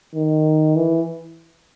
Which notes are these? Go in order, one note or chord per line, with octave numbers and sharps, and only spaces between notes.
D#3
E3